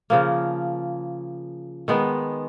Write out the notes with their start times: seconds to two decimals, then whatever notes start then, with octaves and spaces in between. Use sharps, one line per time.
0.10 C#3 F3 A#3
1.88 D#3 G#3 B3